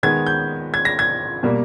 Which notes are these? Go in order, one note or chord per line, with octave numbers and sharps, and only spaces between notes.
D#3 G#3 B3 G#6
G6
G#6
A#6
G#6
B2 G3 A#3